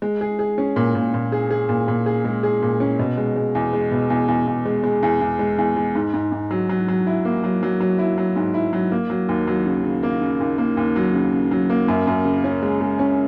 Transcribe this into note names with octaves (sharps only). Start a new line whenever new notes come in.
G#3
G#4
G#4
C#4
A#2
A#2
A#2
G#4
G#4
A#2
A#2
G#4
G#3
G#4
A#2
C#4
B2
G#3
G#3
E2
G#3
B2
E2
E2
E2
G#3
G#3
E2
E2
G#3
E2
G#3
G#2
G#2
G#2
F#3
F#3
F#3
E4
A#3
F#3
F#3
F#3
E4
F#3
G#2
E4
F#3
A#3
F#3
D#2
F#3
C#3
C#3
A#3
C#3
D#2
A#3
D#2
F#3
C#3
C#3
F#3
A#3
F#2
F#2
C#3
C#4
G#3
G#3
C#4